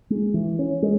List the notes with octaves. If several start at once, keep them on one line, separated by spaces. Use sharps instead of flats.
G#3
E3
C#4
G#3